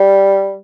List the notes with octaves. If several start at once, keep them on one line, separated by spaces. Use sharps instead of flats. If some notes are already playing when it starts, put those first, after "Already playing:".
Already playing: G3